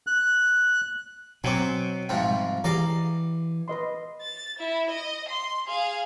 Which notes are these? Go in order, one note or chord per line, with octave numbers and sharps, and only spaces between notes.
F#6
B2 F#3 C4 G#5 D6
C2 G#2 F3 G5
E3 G4 G#4 D5 F5 A#5
B4 D#5 C6
A6
E4
D#5
C6
G#4 F5